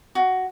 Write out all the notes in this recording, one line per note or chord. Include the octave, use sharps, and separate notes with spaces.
F#4